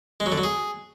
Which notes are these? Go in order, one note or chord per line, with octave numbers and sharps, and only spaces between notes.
G#3
F#3
D3
F#3
G#4